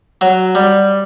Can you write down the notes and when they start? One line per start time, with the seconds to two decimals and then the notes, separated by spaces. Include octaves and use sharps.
0.21 F#3
0.55 G3